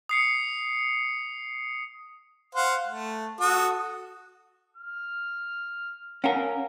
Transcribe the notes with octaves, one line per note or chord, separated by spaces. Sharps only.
D#6 C7 C#7
C5 F5 F#5
A3
F#4 A4 D#6
F6
C#4 A#4 F5 F#5 G#5